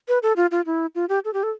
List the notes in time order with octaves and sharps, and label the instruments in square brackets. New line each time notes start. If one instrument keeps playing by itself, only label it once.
[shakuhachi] B4
A4
F4
F4
E4
F4
G4
A4
G4
A4